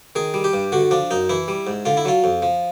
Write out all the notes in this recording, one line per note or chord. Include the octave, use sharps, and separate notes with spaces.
D#3 G#4
G3
G4
G2
D3 F#4
F3 D4
F#2 D#4
E3 E4
G3
G#2
D3 F4
E4
F#3 F4
F2
F3